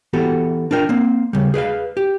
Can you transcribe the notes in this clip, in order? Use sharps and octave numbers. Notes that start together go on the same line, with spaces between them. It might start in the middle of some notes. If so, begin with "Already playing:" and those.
E3 B3 F#4 G4 A4
D4 F4 A#4 G5
A#3 C4
C#3 G3
G#4 B4 D5 F5
G4